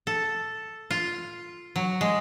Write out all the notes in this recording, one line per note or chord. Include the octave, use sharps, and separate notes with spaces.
A4
F4
F#3
G#3